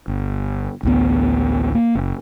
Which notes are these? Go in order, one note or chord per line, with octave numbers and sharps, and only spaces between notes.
G1
A1 D2 B3
A#3
F#1